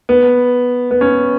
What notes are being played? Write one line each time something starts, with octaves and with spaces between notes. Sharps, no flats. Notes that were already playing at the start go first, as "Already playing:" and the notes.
B3
B3
C#4